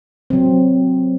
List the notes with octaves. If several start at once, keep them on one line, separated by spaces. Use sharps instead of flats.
F#3 C4